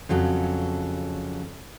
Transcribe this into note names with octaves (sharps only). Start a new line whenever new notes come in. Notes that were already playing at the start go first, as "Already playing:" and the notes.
F2 C#3 F#3 A4